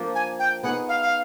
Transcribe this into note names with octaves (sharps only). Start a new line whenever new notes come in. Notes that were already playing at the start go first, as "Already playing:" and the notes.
Already playing: F3 A#3 D4
G#5
G5
B3 D#4 G#4 C#5 F#5
F5
F5